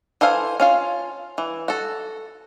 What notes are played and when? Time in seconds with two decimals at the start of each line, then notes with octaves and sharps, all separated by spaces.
0.21 E3 A4 C5 F5 G#5
0.60 C#4 F4 F5
1.38 E3
1.68 F#4 A4